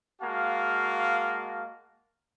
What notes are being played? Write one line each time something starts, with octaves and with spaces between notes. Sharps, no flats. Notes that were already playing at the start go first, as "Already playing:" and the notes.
G#3 A#3 F#4 F5 A5